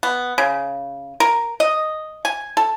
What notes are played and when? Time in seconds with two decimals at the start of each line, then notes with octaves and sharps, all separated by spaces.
0.03 B3
0.38 C#3
1.20 A#4
1.60 D#5
2.25 G#5
2.57 A4